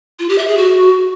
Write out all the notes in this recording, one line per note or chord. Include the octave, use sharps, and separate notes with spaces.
F4
G4
E5
G#4
F#4